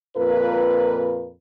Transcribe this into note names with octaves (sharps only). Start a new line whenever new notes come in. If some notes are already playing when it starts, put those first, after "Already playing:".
F2 A#2 F4 A#4 B4